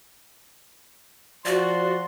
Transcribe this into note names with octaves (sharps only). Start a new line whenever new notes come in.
F3 F#4 D5 C6